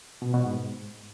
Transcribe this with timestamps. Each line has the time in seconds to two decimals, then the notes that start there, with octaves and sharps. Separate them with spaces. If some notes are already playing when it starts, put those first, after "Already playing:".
0.22 B2
0.34 B2
0.45 G#2